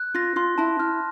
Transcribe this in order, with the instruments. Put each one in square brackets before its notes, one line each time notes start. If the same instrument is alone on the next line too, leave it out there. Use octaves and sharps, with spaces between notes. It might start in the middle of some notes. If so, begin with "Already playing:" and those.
Already playing: [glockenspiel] F#6
[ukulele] F4 [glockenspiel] A#6
[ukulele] F4 [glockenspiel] C6
[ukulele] E4 [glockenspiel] A5
[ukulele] E4 [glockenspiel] F6